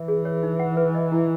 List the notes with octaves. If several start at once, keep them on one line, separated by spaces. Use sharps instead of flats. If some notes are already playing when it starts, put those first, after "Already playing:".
Already playing: E3 E5
G#4
C#5
D#4
F#5
B4
D#5
E4